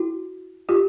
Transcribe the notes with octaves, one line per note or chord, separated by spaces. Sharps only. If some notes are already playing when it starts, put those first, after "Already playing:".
Already playing: E4 F#4
F4 G4